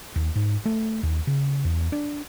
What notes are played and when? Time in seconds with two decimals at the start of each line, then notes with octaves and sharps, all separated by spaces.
0.16 D#2
0.35 G#2
0.65 A3
1.03 D#2
1.27 C#3
1.65 E2
1.92 D4